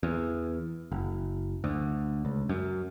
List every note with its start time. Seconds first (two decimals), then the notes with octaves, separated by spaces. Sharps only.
0.03 E2
0.92 F#1
1.64 D2
2.25 C#2
2.49 F#2